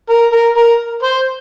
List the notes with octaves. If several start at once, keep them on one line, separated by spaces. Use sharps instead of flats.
A#4
A#4
A#4
C5